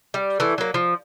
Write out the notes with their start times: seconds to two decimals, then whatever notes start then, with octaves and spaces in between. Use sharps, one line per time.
0.14 G3
0.40 E3 A3
0.58 F#3 A#3
0.74 F3